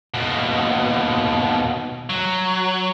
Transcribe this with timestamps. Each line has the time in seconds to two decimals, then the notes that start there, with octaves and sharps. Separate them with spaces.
0.14 D#2 B2
2.10 F#3